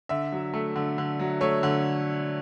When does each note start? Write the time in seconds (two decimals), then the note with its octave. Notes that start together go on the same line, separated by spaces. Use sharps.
0.09 D3 E5
0.32 F#3
0.54 A3
0.76 D3
0.98 D3
1.19 F#3
1.41 A3 C#5
1.63 D3